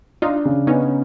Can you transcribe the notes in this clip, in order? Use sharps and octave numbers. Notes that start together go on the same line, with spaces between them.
D4 D#4 F4
C#3
B3 C#4 D#4